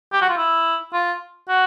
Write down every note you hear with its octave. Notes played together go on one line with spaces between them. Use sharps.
G4
F#4
F4
E4
F4
F#4